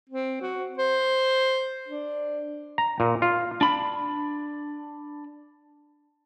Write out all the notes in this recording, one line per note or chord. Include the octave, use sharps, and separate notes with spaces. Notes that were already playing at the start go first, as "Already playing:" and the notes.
C4
F#4
C5
D4
A#5
A#2
F4
D4 B5